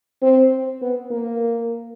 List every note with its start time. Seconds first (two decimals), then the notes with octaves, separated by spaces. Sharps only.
0.22 C4
0.81 B3
1.11 A#3